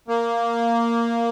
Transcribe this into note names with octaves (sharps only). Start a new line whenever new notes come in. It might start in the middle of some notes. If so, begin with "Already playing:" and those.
A#3